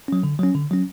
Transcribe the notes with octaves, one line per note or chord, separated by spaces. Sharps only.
F#3 C#4
D3
F#3 C#4
D3
F#3 C#4